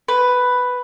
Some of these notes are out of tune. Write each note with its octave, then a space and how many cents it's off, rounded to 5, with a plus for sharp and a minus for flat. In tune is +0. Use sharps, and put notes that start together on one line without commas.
B4 +5